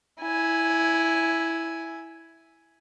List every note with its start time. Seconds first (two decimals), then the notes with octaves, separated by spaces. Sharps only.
0.21 E4 G#5